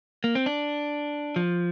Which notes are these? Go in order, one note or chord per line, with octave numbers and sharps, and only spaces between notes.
A#3
C4
D4
F3